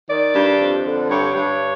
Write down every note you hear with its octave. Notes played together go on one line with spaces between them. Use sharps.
D#3 D5
G2
F2
D3
G2 C#5
G2